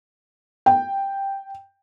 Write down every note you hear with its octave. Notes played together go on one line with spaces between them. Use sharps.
G5